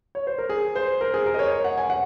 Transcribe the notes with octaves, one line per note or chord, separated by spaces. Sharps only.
C#5
C5
A#4
G#4
C5
A#4
G#4
A#4
D#5
C#5
C#5
F#5
G#5
F#5